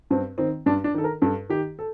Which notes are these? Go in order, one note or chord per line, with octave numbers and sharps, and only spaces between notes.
G2 C4
D#3 C4
G2 D4
D4
D#3 A4
A#4
G2 A4
D#3 G4
A4